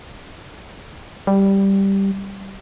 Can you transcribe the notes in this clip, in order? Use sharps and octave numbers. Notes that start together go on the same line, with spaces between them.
G3